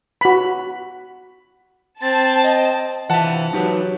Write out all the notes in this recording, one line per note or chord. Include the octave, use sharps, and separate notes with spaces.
F#4 B5
C4 A5 A6
D#5
G2 C3 E3 F3 E5 F#5 A5
F#3 D#4 G4 B4